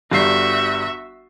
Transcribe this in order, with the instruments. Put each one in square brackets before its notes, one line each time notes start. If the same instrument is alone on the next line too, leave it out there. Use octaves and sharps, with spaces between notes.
[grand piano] G1 G3 C7 [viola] F#4 E5